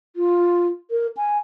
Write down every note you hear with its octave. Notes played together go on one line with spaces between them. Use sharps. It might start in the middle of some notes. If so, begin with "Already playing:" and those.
F4
A#4
G#5